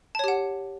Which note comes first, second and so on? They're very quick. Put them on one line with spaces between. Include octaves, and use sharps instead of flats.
A5 C#5 G4 F#5